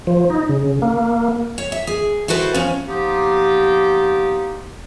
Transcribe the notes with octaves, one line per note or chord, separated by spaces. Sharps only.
F3
D#4
C#3
A#3
C#5
E5
G#4
E4 F#4 A4 B4 C5
F3 C#4
F3 A#3 B3 D#4 G4